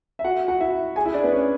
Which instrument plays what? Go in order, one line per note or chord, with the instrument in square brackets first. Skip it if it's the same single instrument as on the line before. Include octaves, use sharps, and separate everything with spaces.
[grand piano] E5
F#4 F#5
F#4 F#5
E4 E5
G#4 G#5
E4 E5
D4 D5
B3 B4
C#4 C#5